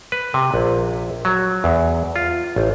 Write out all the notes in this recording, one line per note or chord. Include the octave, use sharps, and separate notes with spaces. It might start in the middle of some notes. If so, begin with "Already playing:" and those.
B4
C3
A#1
F#3
E2
F4
A1